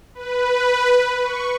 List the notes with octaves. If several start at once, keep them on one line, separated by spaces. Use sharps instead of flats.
B4
C#6